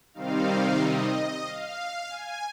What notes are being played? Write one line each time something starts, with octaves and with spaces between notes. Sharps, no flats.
C3 D#3 G3 C4 D#4 F5
D#5
F5
G#5